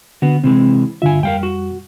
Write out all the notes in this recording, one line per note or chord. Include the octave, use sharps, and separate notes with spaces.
D3 B3 F#4
C3 E3 G#3 C4
G2 D3 F4 E5 G#5
F2 G3 A#4 F5 G5
F#4